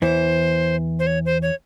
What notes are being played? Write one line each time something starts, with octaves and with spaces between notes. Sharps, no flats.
E2 E3 C5
C5
C#5
C5
C#5